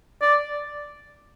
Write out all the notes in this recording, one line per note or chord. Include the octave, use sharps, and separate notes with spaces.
D5